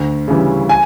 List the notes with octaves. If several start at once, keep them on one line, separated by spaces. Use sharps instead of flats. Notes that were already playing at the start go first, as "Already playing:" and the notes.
Already playing: D2
C#3 E3 G3
G#5